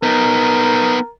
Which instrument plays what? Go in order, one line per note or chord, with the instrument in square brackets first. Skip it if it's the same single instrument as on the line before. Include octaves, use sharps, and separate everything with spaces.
[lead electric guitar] B3 D#4 [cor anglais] A#4